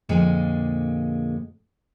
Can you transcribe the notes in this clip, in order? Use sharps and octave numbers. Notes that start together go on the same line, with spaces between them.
F2 A#2 D3 G#3 A#3